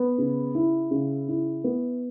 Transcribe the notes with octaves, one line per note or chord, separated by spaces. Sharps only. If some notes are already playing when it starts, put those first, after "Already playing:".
Already playing: B3
C#3
E4
C#3
E4
B3